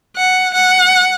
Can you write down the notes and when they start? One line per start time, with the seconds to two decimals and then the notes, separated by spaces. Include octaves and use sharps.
0.16 F#5
0.54 F#5